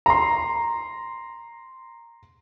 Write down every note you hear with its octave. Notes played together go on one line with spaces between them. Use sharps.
A#5 C6